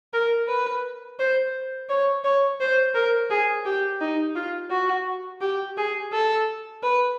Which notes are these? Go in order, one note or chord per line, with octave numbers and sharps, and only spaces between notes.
A#4
B4
C5
C#5
C#5
C5
A#4
G#4
G4
D#4
F4
F#4
G4
G#4
A4
B4